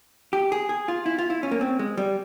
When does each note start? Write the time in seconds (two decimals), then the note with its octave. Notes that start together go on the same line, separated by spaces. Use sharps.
0.33 G4
0.52 G#4
0.69 G#4
0.88 F4
1.06 E4
1.18 F4
1.30 E4
1.43 C#4
1.51 A#3
1.61 C4
1.79 G#3
1.97 G3